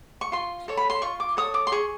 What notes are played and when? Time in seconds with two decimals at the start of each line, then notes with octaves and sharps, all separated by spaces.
0.21 C#6
0.32 F4 C6
0.68 A4 C#5
0.77 B5
0.90 C6
1.02 F4 C#6
1.20 D6
1.37 A4 C#5 D#6
1.54 D6
1.67 C6
1.72 G#4 C#6